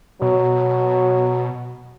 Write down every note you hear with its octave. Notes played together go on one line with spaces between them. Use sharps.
B2 F#3